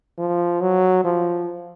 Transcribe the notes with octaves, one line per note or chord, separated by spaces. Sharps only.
F3
F#3
F3